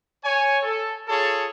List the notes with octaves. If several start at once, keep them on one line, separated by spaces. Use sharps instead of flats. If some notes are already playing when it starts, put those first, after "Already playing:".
C#5 G#5
A4
F4 G#4 A4 C#5 A5